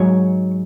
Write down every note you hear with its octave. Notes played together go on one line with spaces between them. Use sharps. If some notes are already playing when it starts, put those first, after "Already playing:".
Already playing: G#2 F#3 C#5